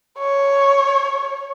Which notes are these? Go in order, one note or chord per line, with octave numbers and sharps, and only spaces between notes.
C#5